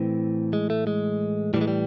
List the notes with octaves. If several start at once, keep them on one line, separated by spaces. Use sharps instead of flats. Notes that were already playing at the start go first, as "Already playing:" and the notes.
Already playing: A2 E3 C4
G#3
A3
G#3
A2 E3 G3
G#3
G3